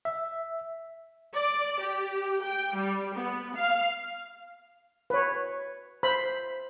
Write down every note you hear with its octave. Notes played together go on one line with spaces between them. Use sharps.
E5
D5
G4
G5
G3
B3
F5
B4 C#5
C5 B5